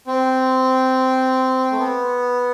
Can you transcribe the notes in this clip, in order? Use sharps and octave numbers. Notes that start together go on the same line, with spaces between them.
C4
A3
B3